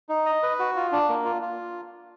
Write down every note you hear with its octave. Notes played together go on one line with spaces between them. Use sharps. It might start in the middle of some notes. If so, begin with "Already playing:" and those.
D#4
D#5
B4
F#4
F4
D4
A#3
F4
F4